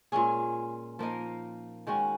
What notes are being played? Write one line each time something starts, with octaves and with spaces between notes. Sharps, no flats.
A#2 G#3 C#4 G#4
F3 A#3 D#4 A#4
D#3 G#3 C#4 F#4